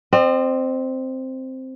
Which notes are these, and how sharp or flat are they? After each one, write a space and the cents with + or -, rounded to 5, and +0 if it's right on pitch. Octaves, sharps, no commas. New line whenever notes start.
C4 +0 D#5 -45